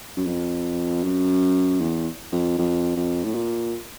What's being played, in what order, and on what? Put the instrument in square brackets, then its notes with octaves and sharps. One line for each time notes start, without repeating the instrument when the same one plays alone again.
[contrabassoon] F#2
F2
F#2
E2
F2
F2
F2
A2
A#2